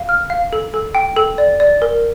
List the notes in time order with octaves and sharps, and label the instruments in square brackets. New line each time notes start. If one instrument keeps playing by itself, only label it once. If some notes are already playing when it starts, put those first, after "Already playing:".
Already playing: [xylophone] F5
F6
F5
A4
A4
G5
A4
D5
D5
A#4